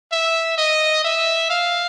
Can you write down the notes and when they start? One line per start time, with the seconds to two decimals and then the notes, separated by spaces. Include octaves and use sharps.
0.12 E5
0.58 D#5
1.04 E5
1.50 F5